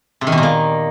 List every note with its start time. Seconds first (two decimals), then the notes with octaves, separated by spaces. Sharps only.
0.21 C3
0.27 D#3
0.32 B2
0.38 A#2
0.43 A#3